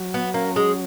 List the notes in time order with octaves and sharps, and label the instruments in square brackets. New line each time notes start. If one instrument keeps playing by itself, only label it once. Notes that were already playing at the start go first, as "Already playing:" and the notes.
Already playing: [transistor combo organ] F#3
[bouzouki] B3
[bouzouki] A#3 [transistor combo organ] C#4
[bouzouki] G#3